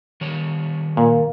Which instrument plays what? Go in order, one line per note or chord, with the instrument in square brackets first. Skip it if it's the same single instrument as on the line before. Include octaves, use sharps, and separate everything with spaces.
[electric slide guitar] D#3 G3 C#5
[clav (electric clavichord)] A#2 [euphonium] A#3